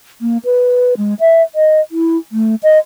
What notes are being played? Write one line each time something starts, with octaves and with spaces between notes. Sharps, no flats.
A#3
B4
G#3
E5
D#5
E4
A3
D#5